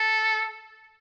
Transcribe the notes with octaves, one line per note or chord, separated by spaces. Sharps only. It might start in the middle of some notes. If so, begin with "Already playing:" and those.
Already playing: A4